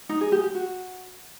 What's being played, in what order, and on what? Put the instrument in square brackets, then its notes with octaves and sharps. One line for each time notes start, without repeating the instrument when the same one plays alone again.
[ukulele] D#4
G#4
G4
G4
F#4